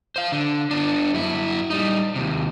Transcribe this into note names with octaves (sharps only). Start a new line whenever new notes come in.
C5 F5
D3
B3 D4
F#2 E4
G3 D#4
D#2 C3